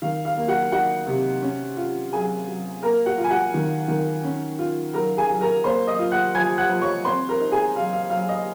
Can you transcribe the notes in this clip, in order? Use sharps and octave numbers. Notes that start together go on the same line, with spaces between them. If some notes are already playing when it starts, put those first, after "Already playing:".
D#3 F5
F5
A#3
F#4 F#5
D#4 F#4 F#5
C3
C#4
F4
F#3 G#4 G#5
F#3
A#3 A#4 A#5
F#4 F#5
F4
G#5
F#4 F#5
D#3
D#3
C#4
F4
F#3 A#4 A#5
G#4 G#5
F#3
A#4 A#5
A#3 C5 C6
D#5 D#6
F4
F#5 F#6
F3 G#5 G#6
F#5 F#6
F3
C#5 C#6
C4 C5 C6
A#4 A#5
D#4
G#4 G#5
F#3 F5
F5
F#3 F5
D#5